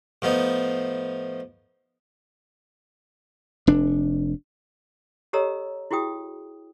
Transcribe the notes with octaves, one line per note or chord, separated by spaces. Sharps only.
A2 F3 B3 D#4
F1 D4
G4 A4 C#5 D#5 A#5 E6
E4 F#4 G#4 G5 D#6